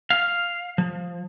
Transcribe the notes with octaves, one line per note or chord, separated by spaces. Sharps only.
F5
F3